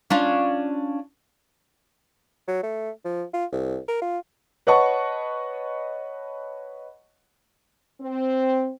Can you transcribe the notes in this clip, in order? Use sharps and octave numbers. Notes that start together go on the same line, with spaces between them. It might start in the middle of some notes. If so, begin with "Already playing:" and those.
C#4 D4 F4
F#3
A3
F3
F4
C2
A#4
F4
B4 C#5 D#5 F#5 A5 C#6
C4